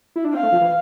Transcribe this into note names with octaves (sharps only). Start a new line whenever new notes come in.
E4
D4
C4 F5
A3
F3
E3